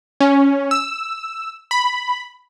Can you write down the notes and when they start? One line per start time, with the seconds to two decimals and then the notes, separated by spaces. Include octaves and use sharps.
0.20 C#4
0.71 E6
1.71 B5